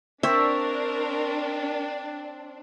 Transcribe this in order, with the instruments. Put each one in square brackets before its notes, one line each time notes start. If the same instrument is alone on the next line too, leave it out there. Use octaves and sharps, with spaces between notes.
[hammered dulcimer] C4 C#5 [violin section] D4 [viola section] A#4 [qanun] E5